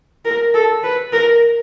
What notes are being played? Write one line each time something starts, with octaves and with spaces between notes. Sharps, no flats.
A#4
A4
B4
A#4